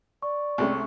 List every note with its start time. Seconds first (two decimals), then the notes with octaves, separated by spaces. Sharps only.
0.22 D5 C#6
0.58 C2 G#3 A3 C#4 C#6